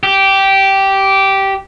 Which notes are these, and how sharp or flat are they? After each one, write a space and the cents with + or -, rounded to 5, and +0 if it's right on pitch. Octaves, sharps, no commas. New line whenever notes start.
G4 -10